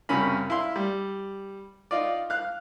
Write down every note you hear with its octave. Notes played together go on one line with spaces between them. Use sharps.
C2 F#2 C#3 C#4 B5
E4 F5 C6
G3
D#4 F4 D5
F5 F#6